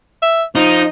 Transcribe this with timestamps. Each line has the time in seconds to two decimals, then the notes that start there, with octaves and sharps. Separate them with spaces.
0.22 E5
0.55 F3 D#4